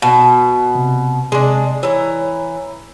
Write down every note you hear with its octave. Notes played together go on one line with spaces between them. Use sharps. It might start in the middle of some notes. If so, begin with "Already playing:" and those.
B2
C3
C3 G#3 D4
E3 C#5 A#5